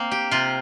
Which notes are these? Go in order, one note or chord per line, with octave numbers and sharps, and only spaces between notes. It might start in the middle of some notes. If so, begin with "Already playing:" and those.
Already playing: A#3 C4
G4
C3 F4